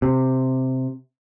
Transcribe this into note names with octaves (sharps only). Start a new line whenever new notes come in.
C3